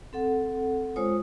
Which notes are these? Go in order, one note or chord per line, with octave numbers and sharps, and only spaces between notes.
C4 A4 F#5
G#3 F4 C5 C#5 D#6